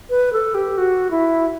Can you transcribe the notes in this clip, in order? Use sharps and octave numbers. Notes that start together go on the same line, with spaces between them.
B4
A4
G4
F#4
E4